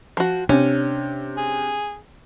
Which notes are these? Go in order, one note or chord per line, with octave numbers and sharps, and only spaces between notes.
F3 F#4
C3 C#4 D4
G#4